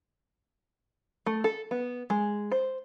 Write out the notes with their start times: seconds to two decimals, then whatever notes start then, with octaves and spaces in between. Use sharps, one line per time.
1.26 A3
1.44 A4
1.71 B3
2.10 G#3
2.52 C5